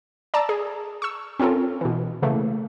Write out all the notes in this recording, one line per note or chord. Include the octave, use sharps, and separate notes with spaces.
D5 A5 A#5 E6
G#4
C#6 E6
C4 C#4 F4 A4 A#4
B2 E3
C#3 E3 A3 A#3